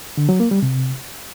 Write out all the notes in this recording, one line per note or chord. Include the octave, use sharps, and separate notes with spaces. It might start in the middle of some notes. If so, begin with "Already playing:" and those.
D3
F#3
A#3
G3
C3